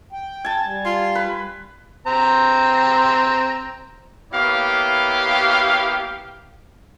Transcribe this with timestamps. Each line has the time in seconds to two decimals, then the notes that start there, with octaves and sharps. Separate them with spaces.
0.13 G5
0.45 G#5 A5
0.65 G3
0.85 F4
1.15 B4
2.07 C4 A#5
4.32 A#3 B3 E4 G4 C#5 F5